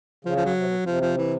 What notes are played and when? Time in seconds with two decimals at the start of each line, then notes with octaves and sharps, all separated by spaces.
0.25 C#3 F3
0.36 F3
0.45 F#3
0.56 C3
0.66 B2
0.86 C3 F3
1.01 F3
1.18 E3